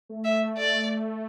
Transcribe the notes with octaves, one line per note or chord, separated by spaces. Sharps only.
A3
E5
D5